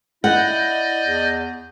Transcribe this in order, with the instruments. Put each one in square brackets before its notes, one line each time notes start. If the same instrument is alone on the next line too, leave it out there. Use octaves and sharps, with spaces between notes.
[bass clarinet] E4 [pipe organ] D5 D#5 G6 [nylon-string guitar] F#5
[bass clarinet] E2